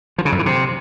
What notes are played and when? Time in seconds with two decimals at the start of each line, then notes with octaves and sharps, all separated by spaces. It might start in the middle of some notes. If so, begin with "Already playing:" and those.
0.18 F3
0.25 C#3
0.32 F#2
0.39 E3
0.46 C3